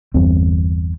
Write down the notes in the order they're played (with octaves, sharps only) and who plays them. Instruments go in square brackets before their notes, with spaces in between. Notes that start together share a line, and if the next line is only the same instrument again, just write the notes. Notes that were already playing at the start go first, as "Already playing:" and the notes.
[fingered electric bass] G1 E2 G3 C4